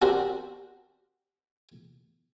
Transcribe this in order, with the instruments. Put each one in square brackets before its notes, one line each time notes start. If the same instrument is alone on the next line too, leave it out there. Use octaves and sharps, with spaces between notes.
[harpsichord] C4 D4 F#4 G4 A#4